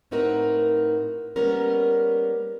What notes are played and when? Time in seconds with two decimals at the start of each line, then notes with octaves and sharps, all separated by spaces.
0.11 A2 C4 D#4 F#4 A#4 B4
1.36 G3 A#3 B3 C#4 A#4 B4